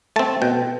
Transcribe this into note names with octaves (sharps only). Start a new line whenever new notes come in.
A3 C4 A5
B2 G5